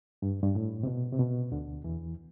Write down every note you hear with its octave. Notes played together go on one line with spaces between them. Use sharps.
G2
G2
A2
C3
B2
C3
B2
D2 D3
E2 E3